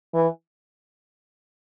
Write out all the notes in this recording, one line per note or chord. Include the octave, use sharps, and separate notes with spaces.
E3